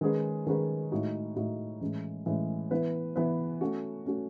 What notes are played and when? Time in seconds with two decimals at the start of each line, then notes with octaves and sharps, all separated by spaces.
0.01 D#3 G#3 C#4 G#4 B4
0.47 D#3 G#3 C#4 G#4 B4
0.92 A2 G#3 D#4 F#4
1.36 A2 G#3 D#4 F#4
1.81 A2 E3 G#3 C#4
2.26 A2 E3 G#3 C#4
2.71 E3 B3 E4 B4
3.16 E3 B3 E4 B4
3.61 A3 C#4 F#4
4.06 A3 C#4 F#4